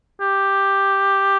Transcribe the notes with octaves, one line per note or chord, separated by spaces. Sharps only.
G4